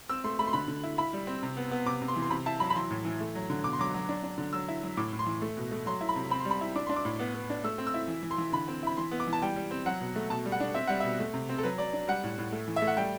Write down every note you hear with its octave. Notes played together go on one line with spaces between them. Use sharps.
C4 E6
A3 C6
A3 B5
C6
D3 B5
D3
E4
E4 B5
G3
C4
C3
B3
B3
C3 D6
C3
C6
E3
C6
C3 B5
E4 A5
F#3 B5
B5
E3 C6
A2
E3
A3
F#3
D3
B2 D6
C6
F#3 D6
F#3
D4
D4
D3
F#3 E6
E4
F#3
A2 D6
A2
C6
E3
A3
B2
A3
F#3 C6
E4
B5
C3
C4 B5
C6
G3
B5
E4
D4 D6
D4 C6
D6
A2
B3
B3
D4
A3 E6
C4
E6
E4
E3
E3
C6
E3
D3 B5
C4
E4 B5
E3 C6
B3
D6
E3
A5
G3 G5
G3
C4
F#3 F#5
B2
A3
B2 A5
G3
F#5
D4
C4 E5
G3 F#5
B2 E5
A3
C3
C4
A4
F#3 B4
F#3 D5
D4
G3 F#5
A2
A2
A3
E3
E5
A3
F#5
G3 G5